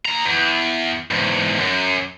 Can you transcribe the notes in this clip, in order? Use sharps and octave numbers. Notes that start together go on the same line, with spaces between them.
D#2 A#5
E2
E2 G#2
F#2